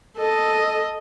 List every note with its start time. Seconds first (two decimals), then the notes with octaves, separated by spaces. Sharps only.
0.17 A4 D#5